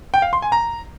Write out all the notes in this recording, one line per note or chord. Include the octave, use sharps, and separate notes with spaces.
G5
F5
C6
G#5
A#5